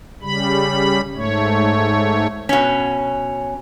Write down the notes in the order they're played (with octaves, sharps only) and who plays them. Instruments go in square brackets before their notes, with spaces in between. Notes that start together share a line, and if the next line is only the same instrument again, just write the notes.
[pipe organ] C#3 G3 B5
G#2 A3 C#5
[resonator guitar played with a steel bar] B2 C#4